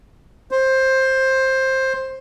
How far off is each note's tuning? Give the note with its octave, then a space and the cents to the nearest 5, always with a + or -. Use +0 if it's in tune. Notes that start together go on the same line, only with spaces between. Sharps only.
C5 +15